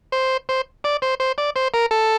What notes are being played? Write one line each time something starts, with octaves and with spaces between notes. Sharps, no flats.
C5
C5
D5
C5
C5
D5
C5
A#4
A4